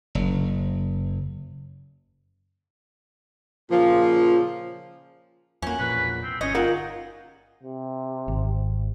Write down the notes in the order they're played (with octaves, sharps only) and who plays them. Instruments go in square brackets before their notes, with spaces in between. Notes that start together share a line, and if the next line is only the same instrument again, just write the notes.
[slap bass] F#1
[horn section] A#2 C#3 F3
[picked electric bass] F2 A#3 [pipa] C#4 F#4
[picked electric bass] E1 A#1 A#2 [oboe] B4
[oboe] C4
[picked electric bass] G1 C#4 [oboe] C#5 [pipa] D#5
[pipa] D#3 F#5 [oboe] D#4 [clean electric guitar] F4 A#4
[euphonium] C3
[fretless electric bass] G#1